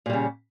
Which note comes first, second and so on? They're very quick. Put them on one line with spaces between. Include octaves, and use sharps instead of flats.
A#2 G3 C#3